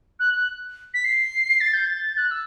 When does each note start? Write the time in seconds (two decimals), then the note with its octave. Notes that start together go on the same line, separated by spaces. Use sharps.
0.20 F#6
0.34 F#6
0.94 B6
1.05 C7
1.61 A6
1.74 G6
1.86 A6
2.17 F#6
2.31 E6